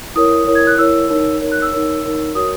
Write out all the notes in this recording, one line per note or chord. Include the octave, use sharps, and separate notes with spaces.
E4 A#4 C#5 D#6
E4 A#4 C#5
G#6
F#6
E4 A#4 C#5 E6
D#4 A#4 C#5
D#4 A#4 C#5
F#6
E6
D#4 A#4 C#5
D#4 A#4 C#5
F#4 A#4 C#5 D#6